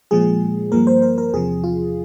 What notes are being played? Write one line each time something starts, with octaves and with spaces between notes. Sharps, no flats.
A#2 F3 G#3 G#4
G2 F3 A#3 A#4
C5
A#4
A#4
E2 C3 F3 G#4
F4